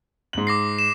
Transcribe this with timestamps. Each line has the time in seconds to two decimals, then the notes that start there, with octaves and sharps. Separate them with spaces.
0.33 G#2 F#7
0.47 D6 A#6 C7
0.79 E7